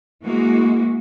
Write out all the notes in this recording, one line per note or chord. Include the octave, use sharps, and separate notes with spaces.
E3 G#3 A#3 F#4